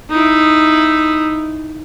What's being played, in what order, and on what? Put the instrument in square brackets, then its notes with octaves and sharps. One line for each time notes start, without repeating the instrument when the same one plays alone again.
[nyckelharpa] D#4 E4